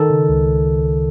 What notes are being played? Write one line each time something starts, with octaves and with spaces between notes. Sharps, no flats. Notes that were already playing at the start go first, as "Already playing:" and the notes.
Already playing: D#3 A4
C#3
C#2